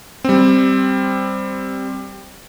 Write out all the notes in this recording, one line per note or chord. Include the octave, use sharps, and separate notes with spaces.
G3 C4